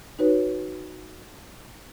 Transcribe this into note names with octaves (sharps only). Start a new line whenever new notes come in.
D#4 F#4 B4 C#5